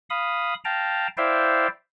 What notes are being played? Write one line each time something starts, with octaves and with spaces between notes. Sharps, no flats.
F5 B5 D#6
F5 G5 A5 A#5
E4 C5 D5 E5 F5 G5